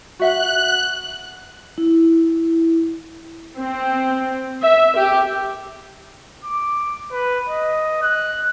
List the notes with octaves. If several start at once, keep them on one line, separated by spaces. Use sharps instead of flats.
F#4 E5 F#5 F#6
E4
C4
E5
G4
D6
B4
D#5
F#6